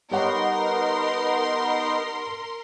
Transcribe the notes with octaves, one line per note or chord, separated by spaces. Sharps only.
G3 B3 D#4 A#4 C#5 F#5 C6